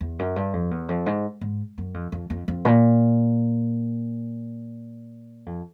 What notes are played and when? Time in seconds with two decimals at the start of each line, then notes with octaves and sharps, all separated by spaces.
0.01 E2
0.19 F#2
0.36 G2
0.53 F2
0.71 E2
0.89 F2
1.06 G#2
1.41 G#2
1.78 F#2
1.94 F2
2.12 F2
2.30 F2
2.48 F2
2.65 A#2
5.46 F2